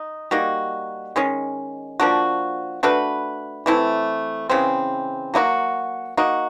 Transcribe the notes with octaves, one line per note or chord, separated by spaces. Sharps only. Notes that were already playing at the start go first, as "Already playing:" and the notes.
Already playing: D#4
G3 A#3 D#4 F#4
D#3 G#3 C#4
F3 A#3 D4 F#4
A3 D4 F#4 B4
E3 A3 C4 E4
C#3 E3 G#3 C4
F#3 A#3 D#4 F#4
A#3 D#4 F#4